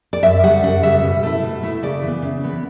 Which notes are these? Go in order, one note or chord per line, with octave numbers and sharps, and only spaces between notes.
D5
F#2 E5
C#3 G3 F#5
F#2 F#5
C#3 G3 E5
B2
A3 E4
B2
A3 E4
C#3 D5
E3 B3
C#3
E3 B3